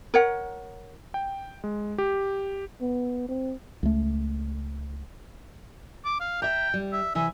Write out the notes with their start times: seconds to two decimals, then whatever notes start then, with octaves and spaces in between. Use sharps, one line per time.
0.14 A#4 C#5 F#5
1.14 G5
1.64 G#3
1.98 G4
2.81 B3
3.29 C4
3.83 C#2 A3
6.05 D6
6.21 F5
6.42 E5 G5 A#5
6.74 G3
6.93 E5
7.15 C3 E3 E5 G#5